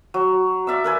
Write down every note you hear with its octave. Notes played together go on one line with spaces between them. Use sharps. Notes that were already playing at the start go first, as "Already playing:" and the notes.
F#3
D5 E5 F5 E6
A#4 B4 G#5